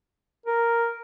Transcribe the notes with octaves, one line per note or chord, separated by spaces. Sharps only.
A#4